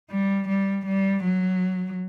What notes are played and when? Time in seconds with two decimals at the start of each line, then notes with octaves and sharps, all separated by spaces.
0.10 G3
0.48 G3
0.86 G3
1.24 F#3